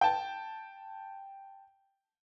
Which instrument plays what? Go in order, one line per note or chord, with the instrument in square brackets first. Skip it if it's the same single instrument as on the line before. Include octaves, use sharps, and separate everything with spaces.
[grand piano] G5 A5